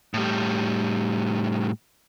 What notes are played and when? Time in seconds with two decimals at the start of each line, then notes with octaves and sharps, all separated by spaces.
0.14 A2 G3